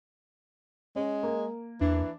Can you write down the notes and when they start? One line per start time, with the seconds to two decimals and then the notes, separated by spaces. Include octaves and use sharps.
0.96 G#3 C#4
1.23 A#3
1.81 E2 E3 D4